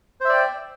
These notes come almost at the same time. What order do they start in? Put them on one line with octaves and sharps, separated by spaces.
C5 E5 D5 G5